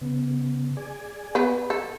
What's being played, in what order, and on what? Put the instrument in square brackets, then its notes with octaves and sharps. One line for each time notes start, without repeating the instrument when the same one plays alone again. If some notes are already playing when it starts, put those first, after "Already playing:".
[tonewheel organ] C#3 B3
G#4 D5 G#5
[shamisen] B3 B4
A4